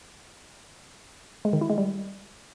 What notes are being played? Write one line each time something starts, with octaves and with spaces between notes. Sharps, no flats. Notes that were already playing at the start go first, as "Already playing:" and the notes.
G#3
D#3
E4
G#3
G3